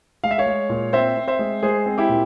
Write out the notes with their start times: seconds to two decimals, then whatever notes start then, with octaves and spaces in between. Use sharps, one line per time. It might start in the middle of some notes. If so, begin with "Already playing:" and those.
0.24 G#3 F5
0.31 E5
0.38 C#5 F5
0.46 G#3
0.69 A#2
0.93 C4 C5 E5
1.17 C4
1.28 C5 E5
1.39 G#3
1.63 G#3 G#4 C5
1.86 C4
1.98 E4 G4
2.09 A#2